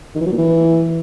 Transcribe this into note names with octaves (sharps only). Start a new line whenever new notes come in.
D#3
E3
F#3
A#2
E3